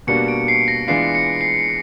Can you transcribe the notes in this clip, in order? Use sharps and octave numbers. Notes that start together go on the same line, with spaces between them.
B2 G3 A#3 D4 F#4 C#7
D7
C7
A#6
E3 G#3 B3 D4 F4 C7
C#7
C7